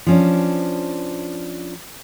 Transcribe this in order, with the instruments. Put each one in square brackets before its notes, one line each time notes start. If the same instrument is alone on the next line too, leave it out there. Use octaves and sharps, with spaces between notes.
[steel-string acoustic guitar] F3 C#4 D4